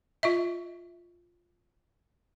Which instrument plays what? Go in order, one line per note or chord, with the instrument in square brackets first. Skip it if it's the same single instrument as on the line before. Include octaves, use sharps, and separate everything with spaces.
[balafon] F4 D#5 E5